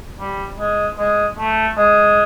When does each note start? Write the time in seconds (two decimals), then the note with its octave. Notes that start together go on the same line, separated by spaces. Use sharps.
0.19 G3
0.59 G#3
0.98 G#3
1.38 A3
1.77 G#3